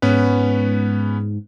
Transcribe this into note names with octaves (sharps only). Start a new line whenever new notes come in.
G#2 B3 C#4 B4